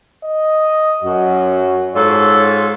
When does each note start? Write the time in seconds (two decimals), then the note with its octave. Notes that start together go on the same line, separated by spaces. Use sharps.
0.25 D#5
1.03 F#2 F#4
1.95 G#2 F4 A4 C#5